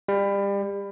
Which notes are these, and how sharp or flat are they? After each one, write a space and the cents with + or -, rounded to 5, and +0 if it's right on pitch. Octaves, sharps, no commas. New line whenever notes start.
G3 +30